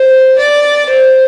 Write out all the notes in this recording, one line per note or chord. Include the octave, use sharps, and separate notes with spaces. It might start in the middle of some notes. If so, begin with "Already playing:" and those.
Already playing: C5
D5
C5